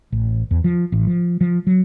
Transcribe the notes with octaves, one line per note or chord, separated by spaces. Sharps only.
A1
E2
F3
A1
F3
F3
F#3